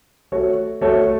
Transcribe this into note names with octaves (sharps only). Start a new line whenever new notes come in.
A3 F#4 A4 C#5
A3 F#4 A4 C#5